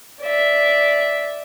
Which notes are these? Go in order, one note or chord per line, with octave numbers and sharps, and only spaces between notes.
D5 E5